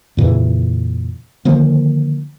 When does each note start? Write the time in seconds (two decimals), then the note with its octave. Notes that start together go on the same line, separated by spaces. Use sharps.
0.17 F2 A#2 C#3 E3
1.45 D3 D#3 F3 A#3